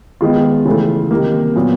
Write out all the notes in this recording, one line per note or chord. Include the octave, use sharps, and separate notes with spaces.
D#3 G#3 B3 F4
C#3 E3 A3
C3 D#3 G3 A#3
A#2 F#3 B3